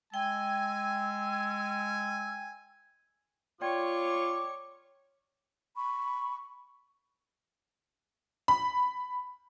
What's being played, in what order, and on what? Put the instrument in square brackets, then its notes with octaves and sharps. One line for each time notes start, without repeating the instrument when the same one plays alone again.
[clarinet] G#3 [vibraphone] G5 [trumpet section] G#5 [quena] E6
[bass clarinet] F4 [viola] C#5 C#6 [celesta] D5 G5 G#6 [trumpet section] D6
[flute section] B5 C#6
[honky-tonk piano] B5